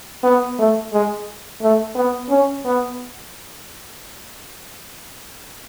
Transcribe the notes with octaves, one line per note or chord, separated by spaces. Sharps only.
B3
A3
G#3
A3
B3
C#4
B3